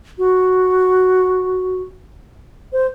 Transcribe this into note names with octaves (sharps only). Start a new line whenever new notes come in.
F#4
C5